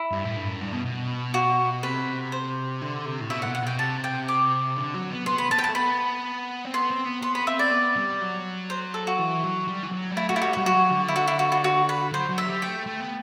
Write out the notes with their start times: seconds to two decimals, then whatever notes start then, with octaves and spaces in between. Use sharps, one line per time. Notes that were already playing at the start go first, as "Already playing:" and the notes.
Already playing: E4
0.11 G2
0.25 A2
0.36 G2
0.48 F#2
0.61 G2
0.72 B2
0.85 B2
1.34 F#4
1.83 C3 B4
2.32 C5
2.81 D3
3.06 C3
3.21 A2
3.30 B2 E5
3.42 F#5
3.46 B2
3.55 F#5
3.62 B2 G5
3.79 C3 A5
4.04 G5
4.28 D6
4.77 D3
4.94 F#3
5.10 B3
5.26 B3 C6
5.38 B5
5.51 B3 A5
5.58 G5
5.64 A5
5.69 A3
5.75 B3 B5
6.65 C4
6.74 B3 C6
6.90 C4
7.06 B3
7.22 B3 C6
7.35 B5
7.47 C4 E5
7.59 D5
7.71 B3
7.96 G3
8.21 F#3
8.70 C5
8.94 A4
9.07 F#4
9.19 E3
9.44 F#3
9.68 G3
9.83 E3
9.92 F#3
10.12 G3
10.17 A3 E4
10.29 A3 F#4
10.36 E4
10.42 G3 F#4
10.53 F#4
10.57 G3
10.66 F#3 F#4
10.91 D3
11.08 E4
11.16 F#4
11.28 E4
11.39 F#4
11.52 F#4
11.64 F#4
11.89 B4
12.13 F#3 C5
12.30 F#3
12.38 E5
12.46 G3
12.62 A3 G5
12.86 A3
13.00 B3